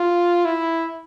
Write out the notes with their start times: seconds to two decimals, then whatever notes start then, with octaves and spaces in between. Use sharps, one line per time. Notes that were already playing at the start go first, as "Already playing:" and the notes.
Already playing: F4
0.45 E4